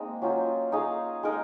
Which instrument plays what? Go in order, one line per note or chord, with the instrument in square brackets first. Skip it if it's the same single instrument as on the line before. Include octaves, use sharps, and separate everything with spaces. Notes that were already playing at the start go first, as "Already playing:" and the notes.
Already playing: [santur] G#3 A#3 C4 D#4
F#3 C#4 F4 C5
D#4 G#4 C#5 F5
G#3 D#4 A#4